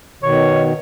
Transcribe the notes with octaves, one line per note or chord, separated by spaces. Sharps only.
B2 D#3 C#5